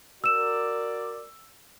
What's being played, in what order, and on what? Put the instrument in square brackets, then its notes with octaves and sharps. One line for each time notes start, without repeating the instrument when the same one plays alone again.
[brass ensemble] F#4 A#4 D5 [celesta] E6 E7